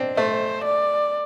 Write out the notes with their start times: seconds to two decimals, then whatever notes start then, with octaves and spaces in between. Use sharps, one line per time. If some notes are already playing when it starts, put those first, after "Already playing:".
Already playing: C4 D4
0.17 A3 C5
0.65 D5